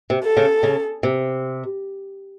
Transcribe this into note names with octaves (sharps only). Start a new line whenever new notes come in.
C3
A4
C#3
C#3
C3